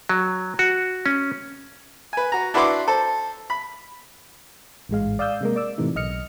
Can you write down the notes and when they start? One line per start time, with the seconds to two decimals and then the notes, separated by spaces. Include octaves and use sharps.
0.09 F#3
0.59 F#4
1.06 C#4
2.13 B4 G#5
2.32 F#4 A#5
2.54 D4 E4 F#4 B4 C6 D6
2.88 A4 C5
3.50 B5
4.89 A1 G#2 G#3 F5
5.19 D5 F5 D#6 E6 G6
5.41 C3 G#3 A#3
5.56 D5 D6 E6
5.78 A2 C3 E3 A3 D#4
5.96 B1 D#5 F6 C#7